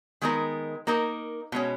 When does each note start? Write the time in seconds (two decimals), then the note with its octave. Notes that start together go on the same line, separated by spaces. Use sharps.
0.21 D#3 G#3 B3 D#4 A#4
0.87 A#3 D#4 A#4
1.52 B2 G#3 C#4